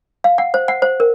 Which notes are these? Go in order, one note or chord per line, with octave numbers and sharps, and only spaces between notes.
F5
F#5
C5
F#5
C5
A#4